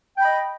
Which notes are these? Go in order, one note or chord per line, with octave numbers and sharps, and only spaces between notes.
D#5 G5 B5